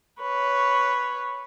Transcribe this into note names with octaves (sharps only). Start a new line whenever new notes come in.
B4 C#5